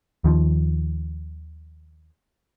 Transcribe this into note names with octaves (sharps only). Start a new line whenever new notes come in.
D#2 D#3 F3